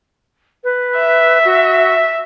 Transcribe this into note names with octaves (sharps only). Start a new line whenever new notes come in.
B4
E5
F#4